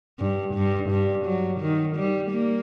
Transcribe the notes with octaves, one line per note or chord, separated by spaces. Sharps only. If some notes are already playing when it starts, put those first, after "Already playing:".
G2
G2
G2
F#3
D#3
G3
A#3